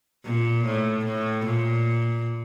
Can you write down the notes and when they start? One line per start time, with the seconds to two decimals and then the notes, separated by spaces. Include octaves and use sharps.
0.25 A#2
0.66 A2
1.06 A2
1.46 A#2